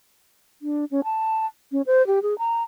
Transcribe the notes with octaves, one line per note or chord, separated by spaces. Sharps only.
D4
C#4
A5
C#4
C5
G4
G#4
A#5